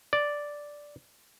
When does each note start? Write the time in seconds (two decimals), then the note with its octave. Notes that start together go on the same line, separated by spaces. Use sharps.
0.13 D5